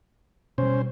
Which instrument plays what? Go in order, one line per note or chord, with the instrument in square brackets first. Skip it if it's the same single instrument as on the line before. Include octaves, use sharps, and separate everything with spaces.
[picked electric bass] B2 G3 [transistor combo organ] C#4 C5